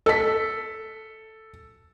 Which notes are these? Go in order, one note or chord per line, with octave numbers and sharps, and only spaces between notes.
A4 B6